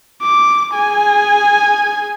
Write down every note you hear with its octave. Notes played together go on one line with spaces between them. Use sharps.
D6
G#4 G#5